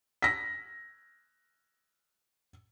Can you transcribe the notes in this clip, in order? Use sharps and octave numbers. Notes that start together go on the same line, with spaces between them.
A#6 B6